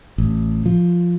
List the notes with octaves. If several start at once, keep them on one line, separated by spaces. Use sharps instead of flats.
A1
F3